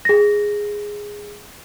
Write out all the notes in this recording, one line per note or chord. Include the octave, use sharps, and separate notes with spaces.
G#4 A#6